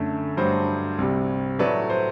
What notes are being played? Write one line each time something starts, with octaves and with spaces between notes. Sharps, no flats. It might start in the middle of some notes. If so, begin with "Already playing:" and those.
Already playing: F#2 D3 A3
G2 F#3 A3 C5
C2 C3 G3
A2 F#3 A3 B4 D5
C5